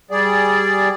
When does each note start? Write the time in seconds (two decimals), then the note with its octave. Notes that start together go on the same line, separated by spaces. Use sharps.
0.11 G3 G#4 D5